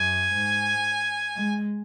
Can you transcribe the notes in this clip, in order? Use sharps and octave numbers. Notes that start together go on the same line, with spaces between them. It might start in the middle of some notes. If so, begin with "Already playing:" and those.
Already playing: F#2 G#5
G#2
G#3